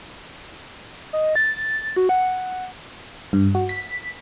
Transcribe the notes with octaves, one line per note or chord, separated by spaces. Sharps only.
D#5
A6
F#4
F#5
G2
F#4
B6